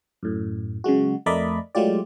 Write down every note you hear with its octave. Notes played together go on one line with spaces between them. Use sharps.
F#2 A2
C#3 F#3 G#3 F#4
F2 A3 A#4 D5 D#5 B5
F#3 G#3 A3 F4 G4 D5